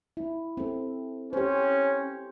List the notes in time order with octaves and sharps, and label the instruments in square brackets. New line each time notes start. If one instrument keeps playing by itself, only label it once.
[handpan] E4
C4 A4
[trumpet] C#4 [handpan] G4 C5